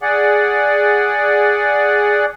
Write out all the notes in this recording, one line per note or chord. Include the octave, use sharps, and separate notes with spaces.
G#4 D5 F#5